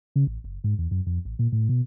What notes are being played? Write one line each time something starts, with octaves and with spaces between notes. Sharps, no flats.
C#3
A1
F#1
G#2
E2
F#2
F2
A1
A#2
A2
B2